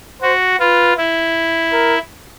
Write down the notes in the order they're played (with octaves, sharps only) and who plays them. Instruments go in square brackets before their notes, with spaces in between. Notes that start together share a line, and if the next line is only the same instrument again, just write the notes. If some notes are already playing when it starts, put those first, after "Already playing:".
[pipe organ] F#4 [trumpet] C5
[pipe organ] F4 [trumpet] B4
[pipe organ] E4
[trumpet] A#4